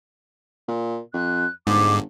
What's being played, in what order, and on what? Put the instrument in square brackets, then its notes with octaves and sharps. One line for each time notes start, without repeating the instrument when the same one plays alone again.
[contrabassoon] A#2
[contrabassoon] F2 [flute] F#6
[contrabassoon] G1 [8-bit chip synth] G#2 [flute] D6